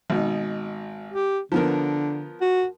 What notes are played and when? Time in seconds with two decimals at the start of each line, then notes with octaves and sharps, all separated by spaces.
0.10 G#1 B2 D#4
1.12 G4
1.52 D3 F3 B3 A#4
2.41 F#4